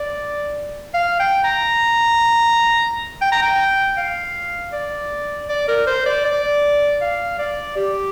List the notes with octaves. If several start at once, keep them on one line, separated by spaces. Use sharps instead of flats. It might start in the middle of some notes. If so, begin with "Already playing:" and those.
Already playing: D5
F5
G5
A#5
G5
A#5
G5
F5
D5
D5
A#4
C5
D5
D5
F5
D5
G4